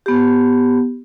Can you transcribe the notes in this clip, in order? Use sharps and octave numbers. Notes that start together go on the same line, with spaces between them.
B3 G4